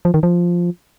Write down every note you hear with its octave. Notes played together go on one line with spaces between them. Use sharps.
F3
D#3
F3